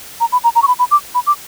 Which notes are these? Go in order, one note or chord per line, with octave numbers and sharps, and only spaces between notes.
A#5
B5
A#5
A#5
C#6
B5
B5
D6
B5
D6